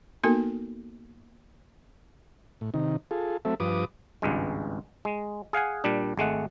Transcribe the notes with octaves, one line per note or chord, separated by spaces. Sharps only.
A#3 B3 D#4 F#4 A4 A#4
A2
C3 D#3 D#4
F4 G#4 A4
F#3 A3 C4 A4 E5
G2 F3 B4 D6 D#6
G#1 C#2 G2 G#3
G#3
G#4 F5 F#5 G#5
A#2 G3 D4
G#1 G#3 A3 F#5